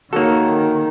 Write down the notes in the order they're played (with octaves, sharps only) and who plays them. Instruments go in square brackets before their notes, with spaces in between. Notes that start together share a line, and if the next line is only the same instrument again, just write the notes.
[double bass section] D#3 [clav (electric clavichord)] A#3 A4 [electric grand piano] F#4 G#4 C#5